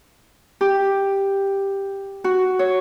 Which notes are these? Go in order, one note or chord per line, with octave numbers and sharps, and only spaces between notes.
G4
F#4
C#5